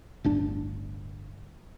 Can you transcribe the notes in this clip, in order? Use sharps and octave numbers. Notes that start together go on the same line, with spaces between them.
D1 G1 D4